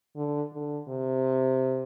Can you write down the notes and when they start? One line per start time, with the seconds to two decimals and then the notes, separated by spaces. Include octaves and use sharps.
0.16 D3
0.53 D3
0.88 C3